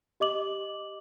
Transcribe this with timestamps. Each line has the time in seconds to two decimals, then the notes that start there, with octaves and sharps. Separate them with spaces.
0.20 G4 D#5 D6 F#7